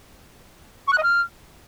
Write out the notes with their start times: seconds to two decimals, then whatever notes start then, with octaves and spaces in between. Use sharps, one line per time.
0.87 C#6
0.92 F#6
0.97 D#5
1.03 F6